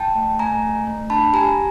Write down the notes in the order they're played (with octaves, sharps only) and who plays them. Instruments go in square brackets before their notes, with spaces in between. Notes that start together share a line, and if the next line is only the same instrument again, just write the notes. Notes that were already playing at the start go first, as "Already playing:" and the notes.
Already playing: [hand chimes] G5 A5
A3
A3 G#5 A#5
A3
A3
D4 A5 B5
G4 G#5 A#5